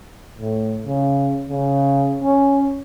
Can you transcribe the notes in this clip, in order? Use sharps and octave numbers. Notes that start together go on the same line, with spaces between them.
A2
C#3
C#3
C#4